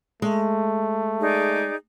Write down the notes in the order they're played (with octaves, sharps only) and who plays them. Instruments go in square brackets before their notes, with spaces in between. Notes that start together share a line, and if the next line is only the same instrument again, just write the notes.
[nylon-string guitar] G#3 [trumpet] A3
[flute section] D#4 G#4 D5